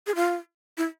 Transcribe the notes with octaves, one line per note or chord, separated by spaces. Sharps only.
G#4
F4
E4